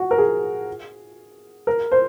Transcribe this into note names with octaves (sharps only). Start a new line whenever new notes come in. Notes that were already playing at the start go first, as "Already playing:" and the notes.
Already playing: F#4
A#4
G#4
A#4
C5